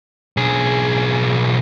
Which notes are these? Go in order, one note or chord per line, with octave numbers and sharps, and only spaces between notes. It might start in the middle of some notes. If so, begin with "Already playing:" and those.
B1 G#4